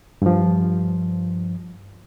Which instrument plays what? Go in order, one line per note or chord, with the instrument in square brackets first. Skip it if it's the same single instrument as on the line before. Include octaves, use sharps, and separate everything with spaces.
[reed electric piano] G2 F3